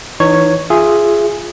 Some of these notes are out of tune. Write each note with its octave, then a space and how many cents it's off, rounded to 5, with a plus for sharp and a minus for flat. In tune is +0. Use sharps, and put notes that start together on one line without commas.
E3 +0 D#4 -25 C#5 +0
F4 +0 G#4 +0 E5 +20